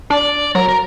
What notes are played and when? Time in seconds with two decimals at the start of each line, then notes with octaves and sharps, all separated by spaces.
0.10 D4 D5
0.55 F#3 A#4
0.69 A#4